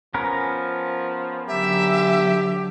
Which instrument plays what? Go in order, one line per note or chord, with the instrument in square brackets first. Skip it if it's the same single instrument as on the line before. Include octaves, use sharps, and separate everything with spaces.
[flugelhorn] F3 [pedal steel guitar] B3 C#4 A#4
[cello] D3 F#3 [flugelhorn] G4 [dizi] E5